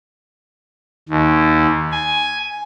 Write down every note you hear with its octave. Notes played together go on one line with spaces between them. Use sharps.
D#2
G#5